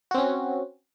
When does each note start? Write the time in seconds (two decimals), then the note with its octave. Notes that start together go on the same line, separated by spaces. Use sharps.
0.11 F#4
0.14 C4
0.18 C#4